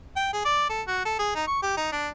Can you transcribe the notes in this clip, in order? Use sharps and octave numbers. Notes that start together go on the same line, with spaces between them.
G5
G#4
D5
A4
F#4
A4
G#4
D#4
C#6
G4
D#4
D4